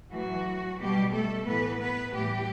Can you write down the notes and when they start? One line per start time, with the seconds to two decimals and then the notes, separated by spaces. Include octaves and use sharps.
0.12 A2 E3 F#3 F#4
0.79 B2 G3 G4
1.13 A3 A4
1.47 A2 E3 B3 B4
1.80 B3 B4
2.14 A2 E3 G3 G4